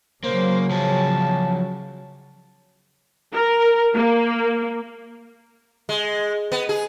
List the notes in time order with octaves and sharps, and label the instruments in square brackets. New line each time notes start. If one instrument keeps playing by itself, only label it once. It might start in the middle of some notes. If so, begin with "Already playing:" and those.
[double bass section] C#3 F#3 [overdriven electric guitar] A#3 [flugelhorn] C5
[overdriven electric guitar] F3 G#4 [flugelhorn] A5
[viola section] A#4
A#3
[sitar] G#3
B3
G#4